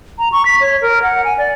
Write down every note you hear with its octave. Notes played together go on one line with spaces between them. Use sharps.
A#5
C#6
B6
C#5
A#4
F#5
G#5
D5